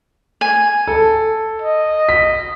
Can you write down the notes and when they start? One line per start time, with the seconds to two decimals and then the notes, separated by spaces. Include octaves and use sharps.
0.41 G#5
0.87 A4
1.62 D#5
2.09 B6